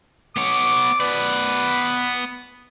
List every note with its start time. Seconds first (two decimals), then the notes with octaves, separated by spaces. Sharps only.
0.37 B3 C#5 D6
1.00 B3 B4 D5